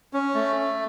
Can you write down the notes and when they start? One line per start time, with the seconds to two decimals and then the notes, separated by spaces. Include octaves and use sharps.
0.13 C#4
0.35 A3